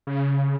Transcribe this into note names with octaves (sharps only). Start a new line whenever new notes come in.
C#3